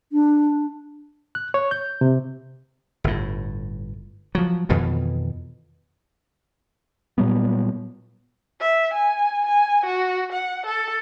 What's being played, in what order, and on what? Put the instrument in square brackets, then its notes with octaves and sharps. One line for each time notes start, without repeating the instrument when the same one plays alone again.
[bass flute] D4
[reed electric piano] F#6
C#5
G6
C3
[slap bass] G1 A2
F3 F#3
F2 B2 D#3 E3
[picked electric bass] A#2 F#3 G3 B3
[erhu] E5
G#5
G#5
F#4
F#5
A4